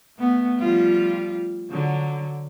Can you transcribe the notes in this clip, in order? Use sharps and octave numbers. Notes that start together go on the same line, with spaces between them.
A3 B3
F3 G3 F4
D3 F#3